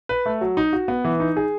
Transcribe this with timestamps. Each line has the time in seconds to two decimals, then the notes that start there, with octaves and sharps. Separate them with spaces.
0.09 B4
0.26 A3
0.41 F#3
0.57 D#4
0.73 F#4
0.88 B3
1.05 E3
1.20 D#4
1.37 G#4